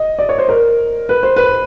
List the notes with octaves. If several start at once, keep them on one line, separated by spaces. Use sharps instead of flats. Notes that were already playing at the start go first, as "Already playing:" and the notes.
Already playing: D#5
D5
C#5
C5
A#4
B4
C5
B4